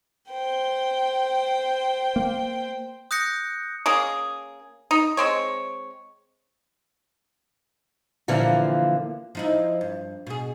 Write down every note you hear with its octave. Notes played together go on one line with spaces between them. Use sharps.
C5 G5
A#3
D#6 F#6 G6 A#6 C#7
A#3 C#4 G#4
D#4
G#3 C4 C#5
A#2 D3 E3 F3 A#3
F3 D#4 E4
G2
B2 G#4